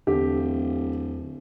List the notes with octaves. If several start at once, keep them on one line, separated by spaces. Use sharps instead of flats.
D1 E2 D3 G4